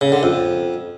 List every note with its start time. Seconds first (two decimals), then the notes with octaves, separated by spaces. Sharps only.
0.01 C#3
0.12 D3
0.23 F2